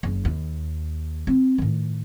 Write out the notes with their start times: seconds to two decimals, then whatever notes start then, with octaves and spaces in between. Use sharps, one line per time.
0.03 F#1
0.25 D#2
1.27 C4
1.58 A2 D#3